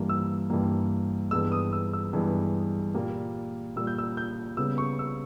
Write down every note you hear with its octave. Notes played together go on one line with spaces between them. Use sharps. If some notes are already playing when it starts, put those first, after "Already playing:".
Already playing: G2 E3 G3 A#3
E6
G2 E3 G3 A#3
G2 E3 G#3 B3 E6
D#6
E6
E6
G2 E3 G#3 B3
A#2 G3 A#3
A#2 G3 A#3 E6
G6
E6
G6
C#3 G3 B3 E6
C#6
E6